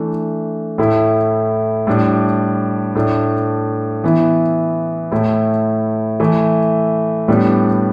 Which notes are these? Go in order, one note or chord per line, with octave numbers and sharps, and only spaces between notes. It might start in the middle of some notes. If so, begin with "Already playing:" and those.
Already playing: E3 A3 D4
A2 A3 E4
A2 G3 D4
A2 A3 D4
E3 B3 E4
A2 A3 E4
E3 A3 E4
A2 G3 B3 D4